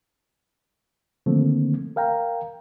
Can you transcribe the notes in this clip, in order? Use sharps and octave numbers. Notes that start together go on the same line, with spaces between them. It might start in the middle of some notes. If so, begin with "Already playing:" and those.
D3 D#3 F3 A3 A#3 C4
A#4 F5 G5 A#5